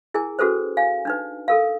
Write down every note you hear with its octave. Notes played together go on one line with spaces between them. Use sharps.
E4 G#4 A#4 G#5
C#4 F#4 G#4 A4 B4 C5
F5 G#5
D4 D#4 B4
A4 A#4 F5